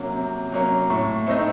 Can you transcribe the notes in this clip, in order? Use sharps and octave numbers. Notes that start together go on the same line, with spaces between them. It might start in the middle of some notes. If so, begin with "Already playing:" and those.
Already playing: C3 F#3 A#3 C#4
C3
F#3 A#3 C#4
A2 C#6
A3 C4 D#4